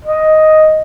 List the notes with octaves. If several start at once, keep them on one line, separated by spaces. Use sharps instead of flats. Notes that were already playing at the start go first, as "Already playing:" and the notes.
D#5